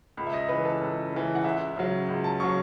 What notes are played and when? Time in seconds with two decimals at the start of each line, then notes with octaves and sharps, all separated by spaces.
0.17 C#2 B5
0.27 E5
0.33 D#5
0.49 C#3 E3 B4
0.65 A4
0.82 C#2
1.12 C#3 E3
1.35 F#5
1.44 C#2 E5
1.76 C#3 F#3
2.08 C#2
2.24 A5
2.40 C#3 F#3 C#6